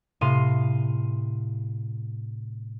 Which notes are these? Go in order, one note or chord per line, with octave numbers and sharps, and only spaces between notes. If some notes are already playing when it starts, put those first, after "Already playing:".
A2 C3 F5 C6 D#7